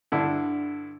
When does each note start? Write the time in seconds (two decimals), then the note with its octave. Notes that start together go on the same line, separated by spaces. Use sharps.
0.12 G2 D3 D4 E4